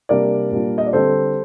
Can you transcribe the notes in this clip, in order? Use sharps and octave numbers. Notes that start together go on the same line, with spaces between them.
C3 G3 A#3 D4 A#4 D5
A#2 G3 A#3 D4
D#5
D5
D3 G3 C4 A4 C5